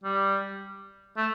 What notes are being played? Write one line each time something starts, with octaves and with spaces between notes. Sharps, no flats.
G3
A3